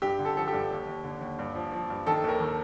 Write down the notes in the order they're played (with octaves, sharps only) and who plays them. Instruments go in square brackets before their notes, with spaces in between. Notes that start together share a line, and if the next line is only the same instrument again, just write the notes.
[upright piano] G2 G4
D3
A4
F3 A4
G4
G2
D#2
D#2
D3
D#2
G2
F3
F3
G2
D#3 A4
D#2 A#4
D#3